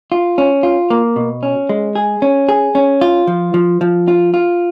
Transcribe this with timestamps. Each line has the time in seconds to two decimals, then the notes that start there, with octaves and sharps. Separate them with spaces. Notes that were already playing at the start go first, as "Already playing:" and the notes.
0.12 F4
0.38 C#4
0.63 F4
0.90 A#3
1.16 B2
1.43 C#4
1.69 G#3
1.95 G#4
2.22 C#4
2.49 G#4
2.75 C#4
3.01 F4
3.27 F3
3.54 F3
3.81 F3
4.08 F4
4.34 F4